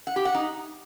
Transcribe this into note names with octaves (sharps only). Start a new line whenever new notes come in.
F#5
G4
F#5
D#4